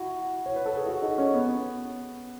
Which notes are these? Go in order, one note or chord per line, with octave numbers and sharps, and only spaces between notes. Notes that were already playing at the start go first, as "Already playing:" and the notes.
Already playing: E4 F#4
C#5
B4
A4
G#4
F#4
D#4
C#4
B3